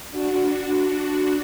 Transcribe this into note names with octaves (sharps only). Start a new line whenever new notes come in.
D4 F#4